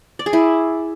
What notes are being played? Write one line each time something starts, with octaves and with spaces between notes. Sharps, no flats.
D5
G#4
E4